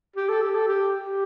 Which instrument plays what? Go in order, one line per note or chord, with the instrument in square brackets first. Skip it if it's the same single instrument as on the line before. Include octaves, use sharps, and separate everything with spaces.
[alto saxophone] G4
A4
G4
A4
G4
G4